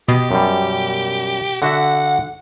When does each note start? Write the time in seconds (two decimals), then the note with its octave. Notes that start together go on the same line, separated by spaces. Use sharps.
0.08 B2 G4 D#5
0.31 F#2 G3
1.62 D3 F#4 E5 F#5